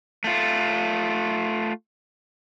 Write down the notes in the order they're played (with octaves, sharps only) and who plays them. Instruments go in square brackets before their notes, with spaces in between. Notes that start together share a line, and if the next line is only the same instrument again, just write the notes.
[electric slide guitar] A3 F4